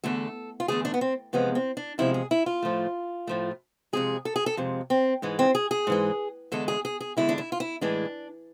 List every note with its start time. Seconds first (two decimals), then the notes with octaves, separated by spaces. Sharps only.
0.04 E2 D3 A3 A4
0.60 F4
0.68 E2 D3 A3 G#4
0.85 D4
0.94 B3
1.01 C4
1.33 E2 C3 F3 G#3 B3
1.55 C4
1.77 D4
1.98 E2 C3 F3 G#3 E4
2.14 G#4
2.31 E4
2.46 F4
2.62 A2 F3 A3
3.27 A2 F3 A3
3.93 F2 C3 G#3 G#4
4.25 A4
4.36 G#4
4.46 A4
4.57 F2 C3 G#3
4.90 C4
5.22 G#2 E3 G#3
5.39 C4
5.55 G#4
5.71 G#4
5.87 G#2 E3 G#3
6.52 E2 D3 G#3 A4
6.68 G#4
6.85 G#4
7.01 G#4
7.17 E2 D3 G#3 E4
7.29 D4
7.38 E4
7.52 F4
7.60 E4
7.81 A2 E3 G#3 D4